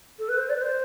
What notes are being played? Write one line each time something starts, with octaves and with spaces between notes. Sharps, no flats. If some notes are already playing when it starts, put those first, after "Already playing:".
A4
B4
C5
D5
B4
C5